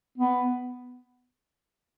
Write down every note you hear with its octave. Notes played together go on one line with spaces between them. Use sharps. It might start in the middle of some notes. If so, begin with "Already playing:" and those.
B3